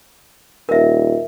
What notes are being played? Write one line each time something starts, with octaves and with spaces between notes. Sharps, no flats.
D#1 A#4 E5